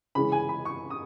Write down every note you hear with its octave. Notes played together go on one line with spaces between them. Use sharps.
C#3 E3 G#3 B5
G#5
B5
C#6
D#6